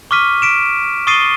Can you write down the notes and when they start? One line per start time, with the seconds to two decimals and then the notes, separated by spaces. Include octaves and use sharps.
0.11 C#6 D6 F6 B6 D#7
0.42 B6 D7 E7
1.07 C#6 D#6 A6 C7 D#7 G7